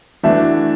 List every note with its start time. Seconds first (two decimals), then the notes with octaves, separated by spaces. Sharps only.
0.23 E3 A3 D4 F#4 E5